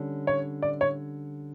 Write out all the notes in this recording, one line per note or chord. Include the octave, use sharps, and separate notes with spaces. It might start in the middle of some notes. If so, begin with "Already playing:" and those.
Already playing: D3 G3 C#4
C#5
D5
C#5